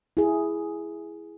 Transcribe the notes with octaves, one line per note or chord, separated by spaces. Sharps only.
E4 G#4